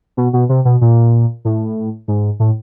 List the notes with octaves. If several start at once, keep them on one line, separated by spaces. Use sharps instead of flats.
B2
B2
C3
B2
A#2
A2
G#2
A2